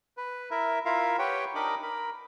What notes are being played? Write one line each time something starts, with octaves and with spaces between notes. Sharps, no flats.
B4
E4 A#4 E5
E4 F4 A#4 E5 F5
G4 B4 C#5 F#5 G5
D4 D#4 A#4 D#5 B5 D6
A#4 B5